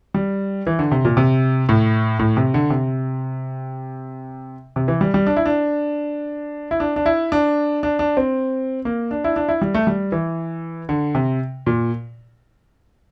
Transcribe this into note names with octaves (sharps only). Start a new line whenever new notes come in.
G3
E3
D3
C3
A#2
C3
A2
A2
C3
D3
C3
C3
E3
G3
G3
D4
E4
D4
E4
D4
D4
E4
D4
D4
D4
C4
A#3
D4
E4
D4
E4
G3
A3
G3
E3
D3
C3
A#2